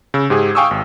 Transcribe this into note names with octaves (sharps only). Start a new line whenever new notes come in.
C#3 E6
G#2 G4 G#4
F5 G5 G#5 C#6 D#6 E6
G#1